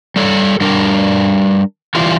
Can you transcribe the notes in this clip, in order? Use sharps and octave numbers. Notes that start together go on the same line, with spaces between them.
G3 A4 C#5
G3 D4 A#4
E3 G3 F4